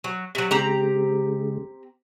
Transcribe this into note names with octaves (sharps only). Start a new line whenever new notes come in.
F#3
C3 F#3
C#3 G#3 C4 G4 A#5